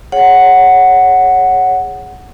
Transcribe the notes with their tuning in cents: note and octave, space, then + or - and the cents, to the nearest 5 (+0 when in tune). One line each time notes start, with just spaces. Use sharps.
G#4 +0 C#5 +0 F#5 +0